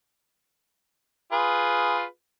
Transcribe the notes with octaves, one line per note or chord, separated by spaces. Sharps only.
F4 G#4 B4